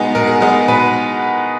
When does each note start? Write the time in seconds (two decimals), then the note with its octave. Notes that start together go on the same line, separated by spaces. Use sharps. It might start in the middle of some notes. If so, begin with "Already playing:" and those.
Already playing: B2 G#3 B3 D#4 G#4
0.15 B2 A#4
0.27 G#4
0.40 G#3 B3 D#4 A#4
0.68 B2 B4